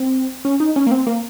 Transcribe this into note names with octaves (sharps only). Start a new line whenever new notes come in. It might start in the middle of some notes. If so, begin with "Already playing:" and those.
Already playing: C4
C#4
D#4
C#4
A#3
C4
A#3